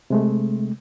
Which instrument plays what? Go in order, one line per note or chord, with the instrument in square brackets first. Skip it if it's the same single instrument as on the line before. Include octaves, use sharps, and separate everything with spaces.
[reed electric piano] C3 G#3 A3